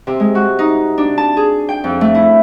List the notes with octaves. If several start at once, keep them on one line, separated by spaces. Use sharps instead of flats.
C3
G#3
F#4
D#4
D4
A5
G#4
G5
F2
A3
E4